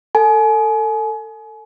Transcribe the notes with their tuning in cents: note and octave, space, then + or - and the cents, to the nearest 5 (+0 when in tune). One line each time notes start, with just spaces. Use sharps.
A4 +25 G#5 +35